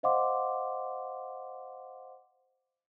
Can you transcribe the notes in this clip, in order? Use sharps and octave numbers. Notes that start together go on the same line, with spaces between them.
C5 D#5 F5 F#5 C6 D6